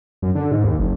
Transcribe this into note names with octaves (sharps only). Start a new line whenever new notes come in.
F#2
D3
G#2
D#2
F#1